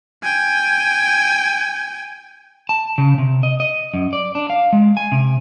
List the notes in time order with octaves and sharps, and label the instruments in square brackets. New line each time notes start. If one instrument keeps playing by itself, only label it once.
[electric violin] G5 G#5
[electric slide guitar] A5
C#3
C3
D#5
D#5
F#2
D5
D4
F5
G#3
G#5
C3